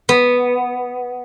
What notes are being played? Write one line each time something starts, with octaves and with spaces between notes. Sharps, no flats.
B3